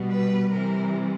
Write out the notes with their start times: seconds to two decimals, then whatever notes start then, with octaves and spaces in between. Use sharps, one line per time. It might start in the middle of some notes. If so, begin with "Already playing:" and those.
Already playing: B2 G3
0.10 B4
0.52 C3 E3 G3 A#4